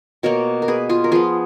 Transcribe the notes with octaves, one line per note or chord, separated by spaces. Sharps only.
B2 A#3 A#4 C#5
A#4
G#4 B4
F4 G#4
A#4
F3 B3 F4 G#4